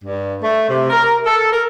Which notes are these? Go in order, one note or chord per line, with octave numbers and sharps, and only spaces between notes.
G2
A3
C3
A#4
A4
A#4